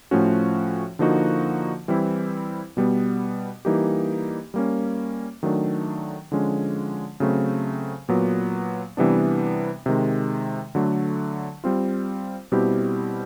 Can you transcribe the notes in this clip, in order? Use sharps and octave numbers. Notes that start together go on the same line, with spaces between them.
A2 F3 A3 C#4 F#4
D3 F3 A#3 D#4 F#4
E3 G3 C4 E4
B2 G3 B3
E3 G3 A#3 D#4 G4
G3 A#3 C#4
D#3 F#3 A3 D4
D3 F3 G#3 C#4
C#3 F#3 A3 C4
A#2 F#3 B3
C3 E3 G3 B3 D4
C3 D#3 G#3
D3 F#3 A3
G3 C4 F4
B2 G3 C4 E4 G4